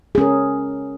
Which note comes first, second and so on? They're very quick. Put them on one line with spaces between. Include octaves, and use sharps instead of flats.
G#4 C#4 A#4